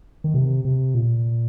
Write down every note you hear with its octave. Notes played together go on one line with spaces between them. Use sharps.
D#3
C3
C3
A#2